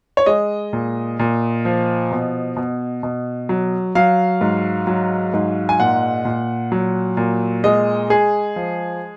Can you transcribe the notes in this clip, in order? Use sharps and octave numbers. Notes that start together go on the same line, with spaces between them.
C#5
G#3 D#5
A#2
A#2
F3
B2
B2
B2
F#3
F#3 F5
G#2
F#3
G#2
G#5
A#2 F#5
A#2
F#3
A#2
G#3 D#5
G#3 G#4
F3